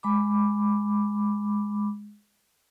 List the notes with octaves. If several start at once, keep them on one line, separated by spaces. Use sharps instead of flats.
G#3 B5 D6